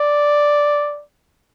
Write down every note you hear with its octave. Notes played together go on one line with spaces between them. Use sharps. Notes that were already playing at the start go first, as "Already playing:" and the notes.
Already playing: D5